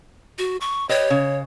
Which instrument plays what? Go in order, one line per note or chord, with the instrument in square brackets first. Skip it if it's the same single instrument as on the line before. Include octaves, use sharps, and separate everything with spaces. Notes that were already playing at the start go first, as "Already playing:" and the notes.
[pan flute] F#4
C#6
[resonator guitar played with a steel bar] G4 B4 D#5 [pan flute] C#5
[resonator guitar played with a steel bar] C#3